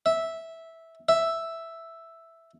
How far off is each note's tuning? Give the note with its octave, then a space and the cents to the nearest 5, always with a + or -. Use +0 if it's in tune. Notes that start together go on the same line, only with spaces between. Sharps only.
E5 -10
E5 +0